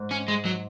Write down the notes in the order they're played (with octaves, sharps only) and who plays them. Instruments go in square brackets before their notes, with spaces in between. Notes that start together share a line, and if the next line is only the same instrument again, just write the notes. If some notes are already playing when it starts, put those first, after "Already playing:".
Already playing: [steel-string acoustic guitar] G#2
[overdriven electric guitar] C#4
G#3
F#3